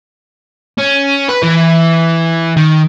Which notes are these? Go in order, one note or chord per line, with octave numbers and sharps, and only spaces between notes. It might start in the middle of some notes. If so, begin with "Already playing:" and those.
C#4
B4
E3
D#3